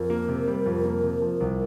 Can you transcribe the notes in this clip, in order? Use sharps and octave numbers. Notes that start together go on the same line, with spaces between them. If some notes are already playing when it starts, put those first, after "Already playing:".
Already playing: F2 A#4
A#3
C3
G3
F2
A#3
C3
F3
C2